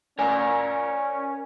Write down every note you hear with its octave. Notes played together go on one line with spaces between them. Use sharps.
C#4 A#4 D5 G#5